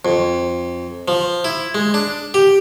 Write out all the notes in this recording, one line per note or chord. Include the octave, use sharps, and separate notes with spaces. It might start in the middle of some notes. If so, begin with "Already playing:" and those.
F2
F3
E4
G#3
D4
G4